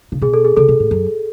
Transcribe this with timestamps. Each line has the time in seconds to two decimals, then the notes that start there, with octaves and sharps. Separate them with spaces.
0.12 C#3
0.21 B2 G#4
0.34 A4
0.45 G#4
0.57 C#3 A4
0.69 B2
0.80 A2
0.91 F#2